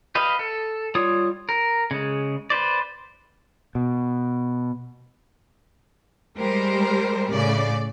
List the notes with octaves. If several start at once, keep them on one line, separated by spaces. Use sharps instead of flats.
G4 B4 D#5 F5
A4
G3 F4 C#5 D#6
A#4
C#3 G#3
B4 C5 D5
B2
G3 G#3 G4 A#4 C5
A2 C#3 D5